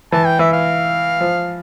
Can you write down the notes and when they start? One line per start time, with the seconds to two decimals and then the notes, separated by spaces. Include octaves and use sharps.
0.12 E3 A5
0.26 G5
0.39 E3 E5
0.53 F5
1.21 F3